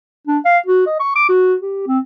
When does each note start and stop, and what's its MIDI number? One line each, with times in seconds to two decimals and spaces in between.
0.27 0.38 62
0.45 0.58 77
0.66 0.85 66
0.87 0.95 75
1.00 1.14 85
1.15 1.26 86
1.29 1.55 66
1.62 1.85 67
1.87 1.99 60